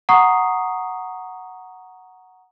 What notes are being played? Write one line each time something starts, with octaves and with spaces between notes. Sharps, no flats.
F#5 A#5 C#6 D#6 C7